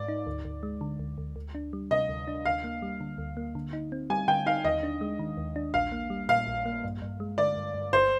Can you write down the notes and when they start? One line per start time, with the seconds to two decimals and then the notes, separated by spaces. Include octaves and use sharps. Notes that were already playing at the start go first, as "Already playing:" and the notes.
Already playing: G#2 D5
0.08 D#4
0.27 D2
0.45 D2
0.63 G#3
0.81 D3
0.99 D2
1.18 D2
1.36 D2
1.55 D4
1.73 G3
1.91 C3 D#5
2.09 D2
2.28 D4
2.45 D2 F5
2.64 A#3
2.82 G3
3.01 D3
3.18 D2
3.37 A#3
3.55 D3
3.73 D#4
3.92 C4
4.10 G3 G#5
4.28 D3 G5
4.46 D#4 F5
4.64 D#2 D#5
4.83 D4
5.01 G#3
5.19 D#3
5.37 D#2
5.56 D4
5.74 A#1 F5
5.92 A#3
6.10 G3
6.29 A#2 F5
6.47 A#1
6.66 A#3
6.84 G2
7.02 G2
7.20 G#3
7.38 D3 D5
7.57 G2
7.74 G2
7.93 G1 C5